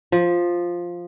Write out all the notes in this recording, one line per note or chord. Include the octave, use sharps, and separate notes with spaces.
F3